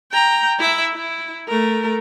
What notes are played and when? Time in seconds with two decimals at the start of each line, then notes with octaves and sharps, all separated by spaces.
0.12 G5 A#5
0.59 E4 E5
0.94 E4
1.48 A3 A#4